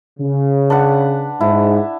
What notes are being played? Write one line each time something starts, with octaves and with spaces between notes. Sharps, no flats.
C#3
D4 B4 F#5
G#2 E4